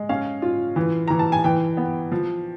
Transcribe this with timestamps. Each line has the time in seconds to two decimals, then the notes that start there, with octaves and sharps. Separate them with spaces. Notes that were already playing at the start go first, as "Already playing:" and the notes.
Already playing: G#3
0.09 C#4 F5
0.42 F4
0.76 E3
1.08 E3 A#5
1.19 A5
1.32 G#5
1.44 E3 G5
1.77 B3
2.12 F3